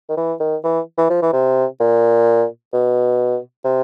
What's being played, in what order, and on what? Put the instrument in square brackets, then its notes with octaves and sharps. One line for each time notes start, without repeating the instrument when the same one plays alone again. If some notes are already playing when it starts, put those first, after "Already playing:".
[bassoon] D#3
E3
D#3
E3
E3
F3
E3
C3
A#2
B2
C3